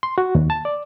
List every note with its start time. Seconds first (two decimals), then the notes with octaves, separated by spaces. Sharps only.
0.03 C6
0.18 F#4
0.35 D#2
0.50 A5
0.65 D5